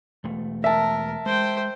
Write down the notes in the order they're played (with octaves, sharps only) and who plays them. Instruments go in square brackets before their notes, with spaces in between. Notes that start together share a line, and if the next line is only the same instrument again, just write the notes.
[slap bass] E1 A3
[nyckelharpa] A#4 [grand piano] E5 A5
[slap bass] G#3 [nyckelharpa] C5 G5